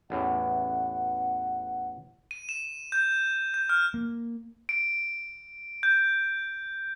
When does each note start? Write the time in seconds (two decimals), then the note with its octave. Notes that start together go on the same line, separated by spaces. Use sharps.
0.10 A1 E2 A2 F#5
2.31 D#7
2.49 E7
2.92 G6
3.54 G6
3.69 F6
3.94 A#3
4.69 D7
5.83 G6